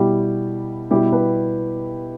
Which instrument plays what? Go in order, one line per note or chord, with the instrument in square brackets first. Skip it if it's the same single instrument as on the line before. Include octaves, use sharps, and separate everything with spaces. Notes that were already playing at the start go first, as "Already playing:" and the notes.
Already playing: [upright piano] B2 G3 E4 G4
B2 G3 E4 G4
B4